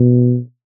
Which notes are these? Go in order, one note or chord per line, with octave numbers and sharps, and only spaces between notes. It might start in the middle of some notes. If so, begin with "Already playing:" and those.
Already playing: B2